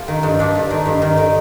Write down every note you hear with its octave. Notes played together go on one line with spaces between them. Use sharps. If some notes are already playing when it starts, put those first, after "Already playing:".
Already playing: F4 G4 A4
D#3
G2
G2 D4
G2
D#3
G2
D#3
D#3